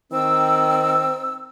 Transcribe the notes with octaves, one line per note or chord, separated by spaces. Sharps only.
D#3 C4 E6